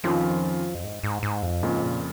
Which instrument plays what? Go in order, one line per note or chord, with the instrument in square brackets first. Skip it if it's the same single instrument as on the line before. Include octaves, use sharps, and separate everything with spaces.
[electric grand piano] F2 D#3 C#4 F4 [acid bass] F3
[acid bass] F2
G#2
G#2
G#2
F2
[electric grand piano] F2 C#3 A#3 F4 [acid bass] G#2
[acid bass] A#2